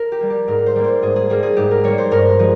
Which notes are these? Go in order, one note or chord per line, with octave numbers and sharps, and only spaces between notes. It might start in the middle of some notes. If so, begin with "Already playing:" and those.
Already playing: A#4
G4
G3 A#3
G4
G#2 A#4
C5
G3 A#3
C5
G#2 G#4
G#4
G3 A#3 G#4
G#4
G#2 G4
A#4
G3 A#3 C#5
C5
G2 A#4
F3 G#3